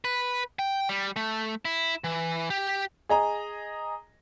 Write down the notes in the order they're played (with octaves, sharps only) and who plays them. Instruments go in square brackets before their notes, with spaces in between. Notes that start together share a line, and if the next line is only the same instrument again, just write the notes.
[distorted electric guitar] B4
G5
G3
A3
E4
E3
G4
[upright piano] G#4 D#5 A#5